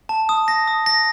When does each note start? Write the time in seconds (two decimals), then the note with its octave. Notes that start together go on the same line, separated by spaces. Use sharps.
0.09 A5
0.29 D#6
0.48 A#6
0.68 D#6
0.86 A#6